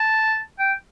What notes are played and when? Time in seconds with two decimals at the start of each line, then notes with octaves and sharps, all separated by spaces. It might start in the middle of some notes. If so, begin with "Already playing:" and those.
Already playing: A5
0.59 G5